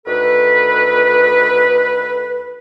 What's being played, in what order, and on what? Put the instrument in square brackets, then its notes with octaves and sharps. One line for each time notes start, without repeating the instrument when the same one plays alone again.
[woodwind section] D2 D#3 A4 B4